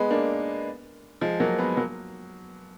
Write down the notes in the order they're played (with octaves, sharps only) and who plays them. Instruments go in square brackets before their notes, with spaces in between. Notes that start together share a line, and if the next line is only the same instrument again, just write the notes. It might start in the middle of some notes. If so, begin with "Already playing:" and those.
Already playing: [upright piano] G#3 B3
A#3 D4
F3 G#3
F#3 A#3
G#3 B3
F#3 A#3